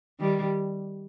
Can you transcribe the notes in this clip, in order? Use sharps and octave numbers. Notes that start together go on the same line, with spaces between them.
D#3 G3